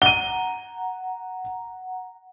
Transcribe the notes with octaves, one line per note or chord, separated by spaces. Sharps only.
F#5 A#5 D#7 G7